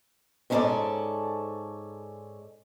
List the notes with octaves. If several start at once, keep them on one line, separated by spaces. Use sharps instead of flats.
G#2 C#4 D4 E4 A4 D5